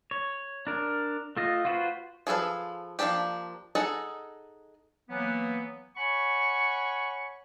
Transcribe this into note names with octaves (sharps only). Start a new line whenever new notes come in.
C#5
D4 A#4
A3 F4 D#5
F4 F#4 B4 C5
F3 G#4 A4 B4 F5
F3 G#3 A#3 D4 G4
D#4 G#4 A4 D#5 F#5
E3 F#3 A#3 B3
C#5 F#5 G#5 B5 C#6